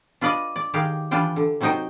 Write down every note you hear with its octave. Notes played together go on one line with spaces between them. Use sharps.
D4 F4 B4 D5 D#5
D5
D#3 G#3 G4 D5 F5
E3 G3 D4 F4 G5
D3
C3 F#3 C4 D#4 C5 G5